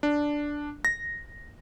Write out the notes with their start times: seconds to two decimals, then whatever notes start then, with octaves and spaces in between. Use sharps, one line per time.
0.03 D4
0.85 A#6